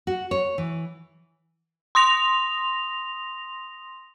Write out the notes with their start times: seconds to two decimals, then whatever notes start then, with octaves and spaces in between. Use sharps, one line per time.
0.07 F#4
0.31 C#5
0.58 E3
1.95 C6 D#6 A#6 F7